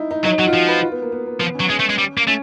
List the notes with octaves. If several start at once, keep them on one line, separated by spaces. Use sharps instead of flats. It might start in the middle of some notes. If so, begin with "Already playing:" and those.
Already playing: D#4 E4
D#4
F#3 D#4
F#3 F#4
F4
F3 F#4
B4
F4
B3
A#3
B3
A#3
F3 B3
C#4
F#3
G#3 C#4
A3
G#3
G3
A#3
A3 C#4